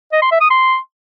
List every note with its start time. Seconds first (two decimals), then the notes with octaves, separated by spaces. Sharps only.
0.12 D#5
0.22 C6
0.31 E5
0.41 D#6
0.50 C6